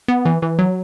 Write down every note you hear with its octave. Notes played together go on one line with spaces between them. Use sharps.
B3
E3
E3
F#3